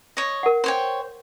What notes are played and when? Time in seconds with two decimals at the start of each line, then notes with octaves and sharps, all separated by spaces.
0.17 C#5 D#5
0.43 A#4 F#5
0.64 C5 C#5 G5